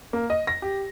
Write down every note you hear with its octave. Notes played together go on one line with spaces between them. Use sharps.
A#3
D#5
A#6
G4